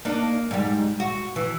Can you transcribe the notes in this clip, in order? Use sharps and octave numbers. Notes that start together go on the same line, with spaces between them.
A#3 D4 D#4
G#2 G3
F#4
E3